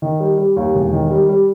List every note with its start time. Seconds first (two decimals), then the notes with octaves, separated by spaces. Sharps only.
0.02 D#3
0.20 G3
0.38 G3
0.56 D#2
0.75 E1
0.93 D#3
1.11 G3
1.29 G3